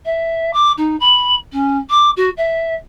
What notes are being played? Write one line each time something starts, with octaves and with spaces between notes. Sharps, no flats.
E5
D6
D#4
B5
C#4
D6
F#4
E5